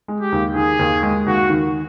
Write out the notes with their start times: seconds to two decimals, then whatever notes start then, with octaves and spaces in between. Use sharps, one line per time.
0.08 G#3
0.20 G4
0.32 D#2
0.55 D#3 G#4
0.79 D#2
1.03 G#3
1.26 D#2 F#4
1.50 D#3